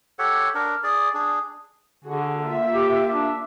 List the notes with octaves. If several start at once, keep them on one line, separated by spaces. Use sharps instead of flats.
G4 A4 C#5 F#5
D4 A#4
G#4 D5
D4 G#4
D3 F#4 G#4
A#3 F4 E5
G4
D4